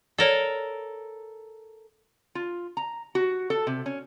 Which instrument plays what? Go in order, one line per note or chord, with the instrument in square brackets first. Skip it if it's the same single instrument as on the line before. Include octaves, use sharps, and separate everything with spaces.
[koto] A4 A#4 [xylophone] C#5 D5
[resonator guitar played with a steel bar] F4
A#5
F#4
A4
C3
C#4